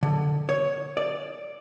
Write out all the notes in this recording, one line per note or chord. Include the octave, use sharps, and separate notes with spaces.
D3
C#5
D5